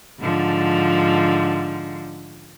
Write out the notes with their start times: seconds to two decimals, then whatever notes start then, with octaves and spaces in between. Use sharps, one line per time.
0.20 G#2 D3 F3